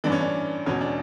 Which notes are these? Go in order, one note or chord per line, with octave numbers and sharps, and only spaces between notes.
A1 G2 E3 D4
C#4
D4
E1 E2 B2 C#4
D4